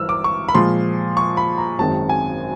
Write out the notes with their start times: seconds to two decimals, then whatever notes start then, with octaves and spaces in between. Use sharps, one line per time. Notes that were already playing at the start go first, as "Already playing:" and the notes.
Already playing: G#1 G2 E3 E6 F6
0.09 D6
0.24 C#6
0.49 B5
0.55 A#2 F3 G#3 C6
1.17 C#6
1.37 B5
1.58 A#5
1.79 G#1 F#2 D#3 G#3 C4 A5
2.09 G#5